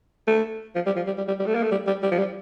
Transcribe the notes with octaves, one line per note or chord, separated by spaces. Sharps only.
A3
F3
G3
F3
G3
G3
G3
G3
A3
A#3
A3
G3
G3
G3
F3
G3